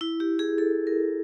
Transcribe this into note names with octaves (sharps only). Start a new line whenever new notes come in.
E4
G4
G#4
A4
A#4